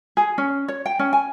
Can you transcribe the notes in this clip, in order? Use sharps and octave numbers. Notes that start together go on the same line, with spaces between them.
G#4
C#4
C#5
G5
C#4
G#5